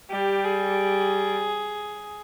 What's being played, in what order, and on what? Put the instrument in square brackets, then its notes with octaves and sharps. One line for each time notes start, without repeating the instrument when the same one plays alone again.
[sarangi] G3 [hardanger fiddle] G4
[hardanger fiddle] G#4